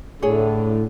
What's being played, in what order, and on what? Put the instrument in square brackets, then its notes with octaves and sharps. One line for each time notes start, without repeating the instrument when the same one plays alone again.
[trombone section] A2 [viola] D3 [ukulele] G#4 C#5